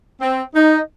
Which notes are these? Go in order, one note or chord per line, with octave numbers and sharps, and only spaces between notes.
C4
D#4